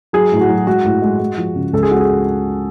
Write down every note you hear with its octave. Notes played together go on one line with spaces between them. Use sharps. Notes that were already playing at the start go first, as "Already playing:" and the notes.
F#3 G#4
A2
F#4
F#3
G#3 F#4
A2
G#3
G#3
F3
C#3
C#2 A4
G#4
G#3 F#4
G#4